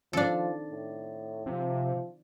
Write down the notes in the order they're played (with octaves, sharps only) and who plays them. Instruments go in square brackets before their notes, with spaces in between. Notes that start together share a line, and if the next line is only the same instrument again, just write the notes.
[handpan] D#3 C4 D5 [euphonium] F3 [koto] D4 A4
[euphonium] A2
[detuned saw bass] C3 [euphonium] F3